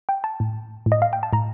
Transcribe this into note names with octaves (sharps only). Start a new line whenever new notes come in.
G5
A5
A2
A2
D#5
F5
G5
A5
A2 A#5